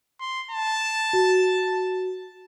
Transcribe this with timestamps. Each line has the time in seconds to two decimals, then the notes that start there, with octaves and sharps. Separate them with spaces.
0.20 C6
0.51 A5
1.13 F#4